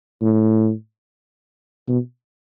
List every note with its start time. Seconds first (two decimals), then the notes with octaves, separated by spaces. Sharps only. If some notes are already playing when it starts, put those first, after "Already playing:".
0.22 A2
1.88 B2